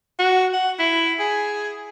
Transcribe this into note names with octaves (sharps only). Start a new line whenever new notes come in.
F#4
F#5
E4
G#4